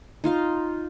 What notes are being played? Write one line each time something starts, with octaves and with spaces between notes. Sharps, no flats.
D#4 F4 F5